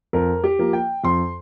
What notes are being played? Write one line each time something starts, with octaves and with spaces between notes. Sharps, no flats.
F2 A#4
G4
F3 A#3
G5
F2 C6